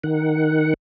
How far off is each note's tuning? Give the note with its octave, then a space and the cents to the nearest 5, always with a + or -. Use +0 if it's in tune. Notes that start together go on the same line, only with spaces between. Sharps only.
D#3 +0 F#5 +0